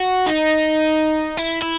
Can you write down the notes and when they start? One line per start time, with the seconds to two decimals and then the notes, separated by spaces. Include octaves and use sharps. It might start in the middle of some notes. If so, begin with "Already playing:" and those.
Already playing: F#4
0.26 D#4
1.37 E4
1.62 E4